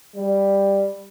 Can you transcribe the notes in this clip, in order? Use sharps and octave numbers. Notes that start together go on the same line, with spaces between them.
G3